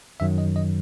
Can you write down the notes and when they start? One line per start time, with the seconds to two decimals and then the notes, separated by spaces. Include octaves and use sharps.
0.20 F#2 D#3 F#3 E5
0.38 D#5
0.56 D#5